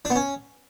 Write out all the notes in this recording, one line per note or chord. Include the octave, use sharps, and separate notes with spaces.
D4
B3
C#4